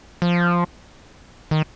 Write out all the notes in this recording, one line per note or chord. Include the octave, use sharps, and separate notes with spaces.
F3
D#3